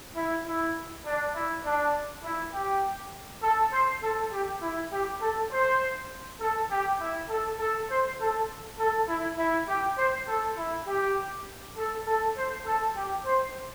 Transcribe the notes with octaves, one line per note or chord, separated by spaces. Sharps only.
E4
E4
D4
E4
D4
E4
G4
A4
C5
A4
G4
E4
G4
A4
C5
A4
G4
E4
A4
A4
C5
A4
A4
E4
E4
G4
C5
A4
E4
G4
A4
A4
C5
A4
G4
C5